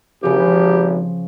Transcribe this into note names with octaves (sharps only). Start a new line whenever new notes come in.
G#1 C#3 F3 G4